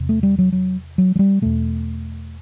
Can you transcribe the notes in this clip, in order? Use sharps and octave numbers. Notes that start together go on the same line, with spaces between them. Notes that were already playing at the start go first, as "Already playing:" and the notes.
Already playing: E2 C3
A3
G3
F#3
F#3
F#3
F#3
G3
E2 B2 A3